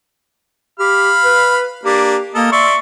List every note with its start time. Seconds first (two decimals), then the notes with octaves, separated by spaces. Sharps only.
0.80 G4 F5 B5 F6
1.24 B4
1.85 A#3 D4 G4
2.35 A#3 A4 A#4 D#5
2.52 D5 E5 C6 C#6